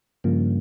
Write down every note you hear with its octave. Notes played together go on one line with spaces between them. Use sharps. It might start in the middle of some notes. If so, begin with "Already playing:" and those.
G2 C#3 F3 A#3